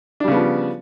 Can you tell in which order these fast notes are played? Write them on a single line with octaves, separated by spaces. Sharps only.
D4 G3 C#3 B3 F3